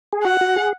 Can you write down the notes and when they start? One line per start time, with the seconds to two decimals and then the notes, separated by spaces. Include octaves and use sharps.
0.13 G#4
0.25 F#4 F#5
0.41 F#4
0.56 G#4